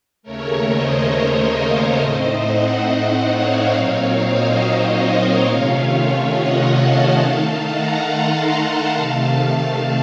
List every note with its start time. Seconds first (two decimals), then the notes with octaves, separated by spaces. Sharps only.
0.23 D#2 C#3 A3 A#4 C#5
0.67 C5 D#5
1.55 C#5 F5
1.97 A2 A3 C4 D#4 C5 D#5
2.41 D#5 F#5
3.28 C#5 F5
3.72 A#2 F#3 C4 D#4
4.16 C5 D#5
5.02 A#4 C#5
5.46 C3 D#3 A3 C#4 F4 C#5 F5
5.90 C#5 F5
6.33 D#5 F#5
6.77 F5 A5
7.20 D#3 A3 D#4
7.65 F#5 A#5
8.08 A5 C6
8.52 F#5 A#5
8.95 C3 D#3 A3 F5 A5